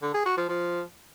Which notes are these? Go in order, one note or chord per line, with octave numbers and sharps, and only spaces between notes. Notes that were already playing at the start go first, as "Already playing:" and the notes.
D3
G#4
F#4
F3
F3